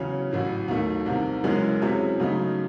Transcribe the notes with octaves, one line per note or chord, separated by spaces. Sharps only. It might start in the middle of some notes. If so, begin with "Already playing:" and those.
Already playing: E2 C#3 F#3 C#4
A1 A2 F#3
D#2 D#3 F#3 A3
C2 C3 D#3
F#1 F#2 E3 G#3 C#4
C3 F#3 C#4 E4 G#4
F#2 C#3 F#3 A3 D#4